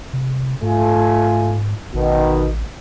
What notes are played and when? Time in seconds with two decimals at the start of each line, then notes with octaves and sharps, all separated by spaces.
0.13 C3
0.62 G#2 A3 F4 G#5
1.94 A1 B2 D#3